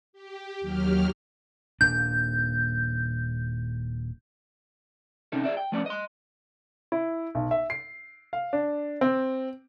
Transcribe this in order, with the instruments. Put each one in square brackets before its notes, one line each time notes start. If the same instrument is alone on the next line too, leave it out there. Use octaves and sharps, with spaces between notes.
[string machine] G4
D#2 F#3 G4 F6
[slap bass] D#1 A#2 D4 [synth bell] G6
[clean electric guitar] C3 C#4 D#4 A4
G#4 A#4 D5 E5
G5
F3 A3 B3 C#4 D5
D#5 C6
[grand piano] E4
B1
E5
C7
F5
D4
C4